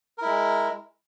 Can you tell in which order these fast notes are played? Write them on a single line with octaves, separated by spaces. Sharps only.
A#4 E4 G#3